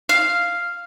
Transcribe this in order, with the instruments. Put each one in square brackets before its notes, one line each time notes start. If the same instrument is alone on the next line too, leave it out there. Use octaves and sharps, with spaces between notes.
[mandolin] F5